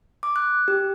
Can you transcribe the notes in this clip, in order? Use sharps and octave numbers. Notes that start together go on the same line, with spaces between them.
D6
F#6
G4